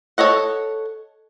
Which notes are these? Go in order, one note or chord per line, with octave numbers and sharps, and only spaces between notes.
A4 C#5 D#5 F#5